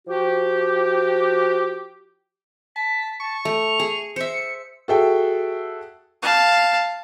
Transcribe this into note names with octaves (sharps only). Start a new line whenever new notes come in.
F3 F#4 G4
A5 B6
A5 C#6
A3 F7
G#4
C5 E5 C#7
F#4 G#4 A4 E5 G5
F5 A5